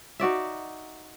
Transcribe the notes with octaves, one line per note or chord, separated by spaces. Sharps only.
D#4 F#4 D5 E5